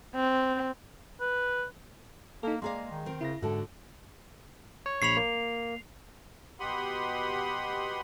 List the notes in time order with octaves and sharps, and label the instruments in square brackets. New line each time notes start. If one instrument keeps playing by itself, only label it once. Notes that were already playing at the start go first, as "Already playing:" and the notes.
[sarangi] C4
[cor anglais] B4
[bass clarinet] A#3 [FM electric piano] D#4 A4
[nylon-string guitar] G#3 G#4 F5 [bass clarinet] A#3 [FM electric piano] D5 A#5 C6
[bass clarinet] D#3
[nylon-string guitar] C4 A#4
[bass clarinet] C#3 [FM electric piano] E4 A#6
[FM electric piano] G#2 [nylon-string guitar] D3 F#4 [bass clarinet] A4
[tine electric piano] C#5
[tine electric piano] A#1 C#5 B5 [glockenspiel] C7 F7
[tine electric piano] A#3
[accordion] B2 G4 F#5 B5 C6 D#6